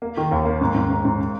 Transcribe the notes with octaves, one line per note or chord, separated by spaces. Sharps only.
A#3
D#3
D#2
A#3
G#2
G#2
G#2
G#2